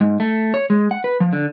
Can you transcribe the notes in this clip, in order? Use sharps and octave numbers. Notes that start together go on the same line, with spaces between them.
G#2
A3
C#5
G#3
F#5
B4
F3
D3